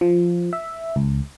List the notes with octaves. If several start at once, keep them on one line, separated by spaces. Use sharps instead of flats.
F3
E5
C#2